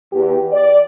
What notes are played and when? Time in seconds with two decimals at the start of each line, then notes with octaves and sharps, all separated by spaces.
0.12 E2 G4
0.52 D5